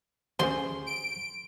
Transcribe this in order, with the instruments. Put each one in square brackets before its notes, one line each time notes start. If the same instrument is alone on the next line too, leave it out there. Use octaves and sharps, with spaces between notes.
[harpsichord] D2 D3 [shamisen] C#4 G#4 C5 [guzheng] C6
[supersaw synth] D7